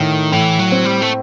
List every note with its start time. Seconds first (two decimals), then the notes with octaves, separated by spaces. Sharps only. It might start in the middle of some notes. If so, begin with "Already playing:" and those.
Already playing: A2 D#3 A3
0.32 A2 E3
0.59 F#3
0.72 C4
0.85 G3
1.02 A3